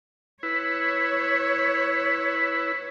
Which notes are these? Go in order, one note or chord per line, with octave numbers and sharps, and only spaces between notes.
E4 B4 C#5